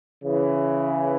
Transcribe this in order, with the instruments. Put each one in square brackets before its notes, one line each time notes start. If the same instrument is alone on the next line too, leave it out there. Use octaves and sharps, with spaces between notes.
[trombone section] C#3 E3